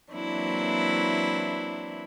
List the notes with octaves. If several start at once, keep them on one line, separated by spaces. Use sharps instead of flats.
E3 F#3 A#3 C4 D4 E4